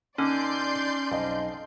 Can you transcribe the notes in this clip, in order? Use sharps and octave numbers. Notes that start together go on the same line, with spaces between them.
D3 A#3 C#4 D#4 D5 C6 G6
B1 F2 D#4 D#5